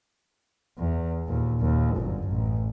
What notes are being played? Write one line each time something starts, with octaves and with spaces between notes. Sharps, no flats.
E2
D#2 A#2
D#2 A#2
G1 F#2
A1